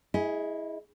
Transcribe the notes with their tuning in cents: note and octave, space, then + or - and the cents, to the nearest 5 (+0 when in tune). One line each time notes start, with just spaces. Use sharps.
E4 -15 G#4 +0 D#5 +10